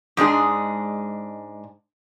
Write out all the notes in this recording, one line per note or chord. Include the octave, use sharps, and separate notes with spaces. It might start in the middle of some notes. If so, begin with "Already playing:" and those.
G#2 G#3 D4 G#4